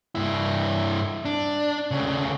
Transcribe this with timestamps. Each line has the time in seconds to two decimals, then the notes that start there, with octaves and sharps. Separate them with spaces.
0.15 G2 E4
1.25 D4
1.91 D2 C#3